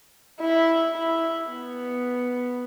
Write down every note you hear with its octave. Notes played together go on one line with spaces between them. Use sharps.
E4
E4
B3